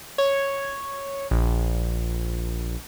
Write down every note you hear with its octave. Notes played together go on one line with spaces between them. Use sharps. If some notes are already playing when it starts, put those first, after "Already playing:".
C#5
A#1